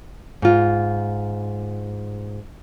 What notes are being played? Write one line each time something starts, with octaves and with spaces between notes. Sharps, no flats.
G#2 F4